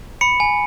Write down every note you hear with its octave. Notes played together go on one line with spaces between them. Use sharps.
B5 C#7
G#5